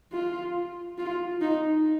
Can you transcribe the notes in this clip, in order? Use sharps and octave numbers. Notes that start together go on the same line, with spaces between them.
F4
F4
D#4